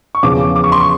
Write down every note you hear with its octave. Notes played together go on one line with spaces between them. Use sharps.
C#6
E2 C#3 F3 D6
D6
C#6
C6
C#6